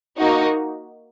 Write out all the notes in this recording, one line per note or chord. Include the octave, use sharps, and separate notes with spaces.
A#3 D#4 F#4